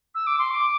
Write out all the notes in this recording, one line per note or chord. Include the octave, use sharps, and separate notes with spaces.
E6
D6
C6
D6